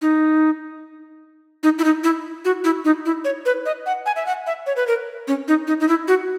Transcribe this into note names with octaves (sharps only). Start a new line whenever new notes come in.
D#4
D#4
E4
D#4
E4
F#4
E4
D#4
E4
C#5
B4
D#5
F#5
G#5
E5
F#5
E5
C#5
B4
A#4
C#4
D#4
D#4
D#4
E4
F#4